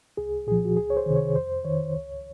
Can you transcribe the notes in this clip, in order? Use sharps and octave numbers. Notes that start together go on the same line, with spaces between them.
C2 G#4
A#2 F3 G#4
F#4
C#2 G#4
C#5
C5
C3 D#3
C#5
F2 C5
D#3 C#5
C#2